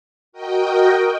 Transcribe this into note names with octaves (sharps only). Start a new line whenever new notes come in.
F#4 A#4 D#5 G5